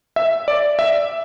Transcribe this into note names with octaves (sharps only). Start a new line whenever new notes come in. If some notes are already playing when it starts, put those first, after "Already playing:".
E5
D5
E5